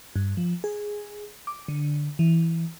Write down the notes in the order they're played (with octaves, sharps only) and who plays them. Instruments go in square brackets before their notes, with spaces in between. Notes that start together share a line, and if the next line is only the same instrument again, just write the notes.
[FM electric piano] G2
F3
G#4
D6
D3
E3